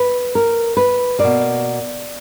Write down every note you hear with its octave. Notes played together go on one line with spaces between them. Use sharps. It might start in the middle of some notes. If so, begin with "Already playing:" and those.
Already playing: B4
A#4
B4
B2 A#3 D5